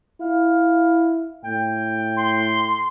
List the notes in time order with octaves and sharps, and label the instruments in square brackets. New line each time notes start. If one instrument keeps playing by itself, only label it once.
[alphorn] E4 [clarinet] F5
[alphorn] A2 [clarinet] G5
[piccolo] C6